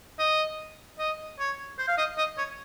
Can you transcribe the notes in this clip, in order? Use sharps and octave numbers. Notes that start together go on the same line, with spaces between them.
D#5
D#5
C#5
C5
F5
D#5
D#5
C#5